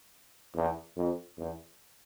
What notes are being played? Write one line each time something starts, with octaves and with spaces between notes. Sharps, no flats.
E2
F2
E2